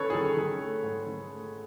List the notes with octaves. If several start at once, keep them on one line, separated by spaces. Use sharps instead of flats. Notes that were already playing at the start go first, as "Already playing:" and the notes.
Already playing: D#3 C#4 A4 B4 C#5
G#4
D#3 A4
D#3 G#4
A3
G#2
D#3
A3